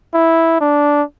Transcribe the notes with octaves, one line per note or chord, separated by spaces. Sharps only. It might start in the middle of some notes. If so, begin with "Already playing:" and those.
E4
D4